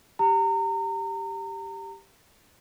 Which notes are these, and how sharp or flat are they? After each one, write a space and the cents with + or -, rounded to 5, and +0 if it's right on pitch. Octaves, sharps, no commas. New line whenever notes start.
G4 +0 A#5 -30